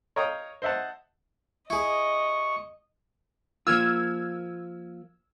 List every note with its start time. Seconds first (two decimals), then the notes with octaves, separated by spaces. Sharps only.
0.16 C#5 D#5 F5 G5 A#5 D#6
0.62 C5 D#5 E5 F#5 A5
1.70 E4 G#4 D#5 C#6
3.67 F3 A#3 F4 E6 F6 G#6